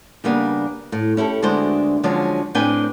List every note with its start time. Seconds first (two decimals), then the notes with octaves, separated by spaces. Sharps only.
0.24 C#3 G3 A#3 B3 D4
0.92 A2
1.17 C#4 E4 G4 A4
1.42 D2 G#3 B3 D4 F#4 C5
2.03 D3 F3 F#3 G#3 C#4 D4
2.55 A2 C4 D4 B4 G5 G#5